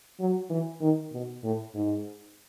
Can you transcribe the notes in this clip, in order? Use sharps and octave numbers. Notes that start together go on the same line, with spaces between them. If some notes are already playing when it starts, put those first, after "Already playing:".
F#3
E3
D#3
B2
A2
G#2